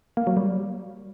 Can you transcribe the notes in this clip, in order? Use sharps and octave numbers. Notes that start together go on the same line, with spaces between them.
A#3
F#3
G3